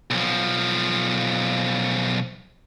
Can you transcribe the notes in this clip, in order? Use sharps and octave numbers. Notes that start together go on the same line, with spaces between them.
B1 F3